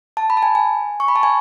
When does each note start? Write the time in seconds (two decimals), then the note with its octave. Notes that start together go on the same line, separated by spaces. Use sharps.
0.17 A5
0.30 B5
0.37 A5
0.43 G#5
0.55 G#5
1.00 C#6
1.08 B5
1.16 A5
1.23 G#5